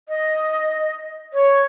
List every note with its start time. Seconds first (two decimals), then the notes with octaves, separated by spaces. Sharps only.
0.08 D#5
1.33 C#5